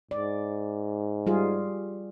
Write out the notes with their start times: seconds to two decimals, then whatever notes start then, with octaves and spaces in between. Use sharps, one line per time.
0.11 G#2 D5
1.27 G3 F4 G#4